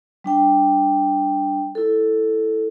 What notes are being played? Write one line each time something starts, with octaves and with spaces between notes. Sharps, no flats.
G3 D4 G5
E4 A4